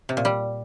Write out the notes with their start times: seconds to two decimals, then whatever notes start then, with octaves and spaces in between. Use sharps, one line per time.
0.09 C3
0.17 A#2
0.25 G3